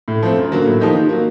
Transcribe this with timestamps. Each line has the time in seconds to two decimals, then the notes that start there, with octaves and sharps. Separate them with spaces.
0.08 A2
0.23 F3 A3 C4
0.38 F#2
0.52 D3 F#3 A#3
0.66 A2
0.81 F3 A#3 D#4 G4
0.95 D#3
1.09 F#3 A#3